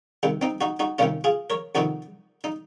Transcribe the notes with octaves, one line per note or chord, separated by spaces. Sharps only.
C2 C3 D#3
C4 D#4
D#4 F#4
D#4 F#4
C2 C3 D#3 C#4 F4
F4 G#4
A#4 C#5
F2 C3 D#3 D#4 F#4
D#4